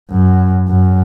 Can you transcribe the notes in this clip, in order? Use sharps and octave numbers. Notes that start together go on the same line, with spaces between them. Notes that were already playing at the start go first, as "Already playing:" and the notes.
F#2
F#2